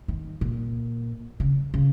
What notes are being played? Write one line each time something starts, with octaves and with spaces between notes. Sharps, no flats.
D#3
A#2
C#3
C#3